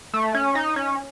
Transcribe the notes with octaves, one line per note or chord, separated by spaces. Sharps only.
A3
C#4
D#4
C#4